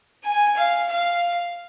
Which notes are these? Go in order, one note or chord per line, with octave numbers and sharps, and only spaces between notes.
G#5
F5
F5